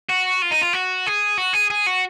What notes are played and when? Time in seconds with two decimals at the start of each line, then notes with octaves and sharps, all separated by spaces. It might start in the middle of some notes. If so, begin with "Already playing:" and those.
0.09 F#4
0.42 F4
0.51 D#4
0.61 F4
0.73 F#4
1.06 G#4
1.38 F#4
1.54 G#4
1.70 G#4
1.87 F#4